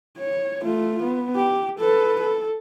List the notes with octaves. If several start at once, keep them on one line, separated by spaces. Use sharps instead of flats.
C#5
A3 F4
B3
G4
A4 B4
A4